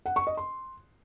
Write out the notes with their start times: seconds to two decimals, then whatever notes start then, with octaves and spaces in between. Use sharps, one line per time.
0.06 F#5
0.16 C#6
0.27 D#5
0.37 C6